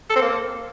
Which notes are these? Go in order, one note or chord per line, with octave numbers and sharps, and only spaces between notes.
A4
C4
A#3